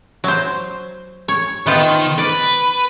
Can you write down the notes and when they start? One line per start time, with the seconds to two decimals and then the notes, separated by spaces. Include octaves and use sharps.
0.24 F#3 C5
1.28 C#5
1.67 D#3 B3 F4 C5
2.18 B4 D5